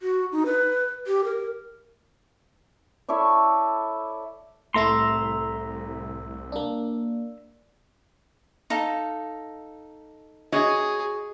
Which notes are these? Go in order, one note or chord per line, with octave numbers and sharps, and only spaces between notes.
F#4
D#4
B4
G4
A#4
E4 A4 C#5 D5
C2 A2 A3 E4 E5 A#5 C6
A#3 D4
D#4 A4 F5
F#4 G#4 C#5 D#5